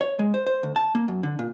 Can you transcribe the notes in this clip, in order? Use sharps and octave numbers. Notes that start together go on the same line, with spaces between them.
C#5
G#3
C5
C5
D2
A5
A#3
F#2
D3
A#2